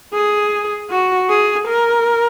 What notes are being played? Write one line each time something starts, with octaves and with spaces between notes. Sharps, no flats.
G#4
F#4
G#4
A#4